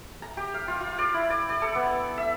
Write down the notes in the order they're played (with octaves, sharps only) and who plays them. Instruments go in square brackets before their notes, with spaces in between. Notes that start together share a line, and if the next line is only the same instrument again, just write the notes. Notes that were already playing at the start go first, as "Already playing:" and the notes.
[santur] A#5
G4
F5
F4
F4
D5
E4
D5
D5
A4
B3
E5